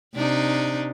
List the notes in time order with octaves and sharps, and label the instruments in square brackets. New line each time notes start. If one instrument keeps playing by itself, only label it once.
[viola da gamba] C3 D4 D#4